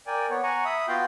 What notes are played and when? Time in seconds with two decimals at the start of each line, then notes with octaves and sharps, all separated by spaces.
0.07 A#4 D5 G5 G#5
0.30 B3 C#5
0.43 F#5 G#5 A#5 C#6
0.65 E5 B5 D#6
0.88 B3 F4 F#4 F5 G5 G6